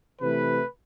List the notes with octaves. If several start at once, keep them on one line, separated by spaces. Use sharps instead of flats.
C3 E3 A3 B4